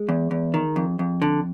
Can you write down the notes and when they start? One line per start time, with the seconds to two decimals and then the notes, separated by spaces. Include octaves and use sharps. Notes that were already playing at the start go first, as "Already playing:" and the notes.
Already playing: G#3
0.09 E2
0.31 E2
0.54 D#3
0.76 F2
0.99 F2
1.22 D3